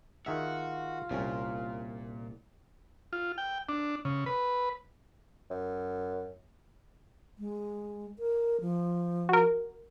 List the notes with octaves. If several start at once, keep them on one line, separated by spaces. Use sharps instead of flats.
D#3 F4 F#4 G#4 E5
C2 A#2 C#4
F4
G5
D4
C#3
B4
F#2
G#3
A#4
F3
F#4 A#4